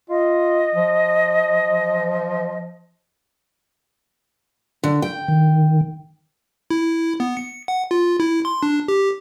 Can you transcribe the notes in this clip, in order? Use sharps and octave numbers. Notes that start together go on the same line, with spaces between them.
F4 D#5
F3
D3
G5
D#3
E4
B3
C#7
F#5
F4
E4
C6
D4
G4